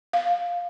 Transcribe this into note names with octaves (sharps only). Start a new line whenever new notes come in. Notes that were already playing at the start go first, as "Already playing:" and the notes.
F5